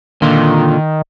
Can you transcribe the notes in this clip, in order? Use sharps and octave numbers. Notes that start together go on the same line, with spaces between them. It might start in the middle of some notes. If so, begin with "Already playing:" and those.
A#2 D3 D#3 F4